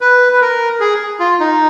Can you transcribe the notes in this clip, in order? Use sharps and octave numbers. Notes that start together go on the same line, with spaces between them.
B4
B4
A#4
G#4
F4
D#4